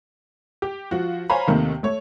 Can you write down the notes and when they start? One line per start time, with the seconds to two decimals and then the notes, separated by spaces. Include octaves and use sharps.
0.62 G4
0.91 F3 F4 F#4
1.30 C5 C#5 F5 G#5 A#5 B5
1.47 D#2 C3 D#3 A3
1.83 A3 C#5